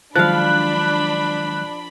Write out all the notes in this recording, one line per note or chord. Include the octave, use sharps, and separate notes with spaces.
D#3 F3 F#3 G#3 D4 F5 B5 F#6